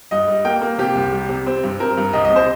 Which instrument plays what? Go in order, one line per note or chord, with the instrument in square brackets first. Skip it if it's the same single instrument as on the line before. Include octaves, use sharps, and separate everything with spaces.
[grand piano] G2 D#5
G3
A#3 G5
A#3
C3 G4
C2
G3
C3
C4
G2
C4 A#4
G2
C2 D#5
D#5
C3
C5